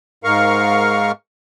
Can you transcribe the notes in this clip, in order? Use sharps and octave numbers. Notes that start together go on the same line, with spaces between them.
G#2 A#4 F5 C#6